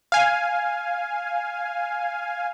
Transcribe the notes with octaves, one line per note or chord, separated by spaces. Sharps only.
F5 G#5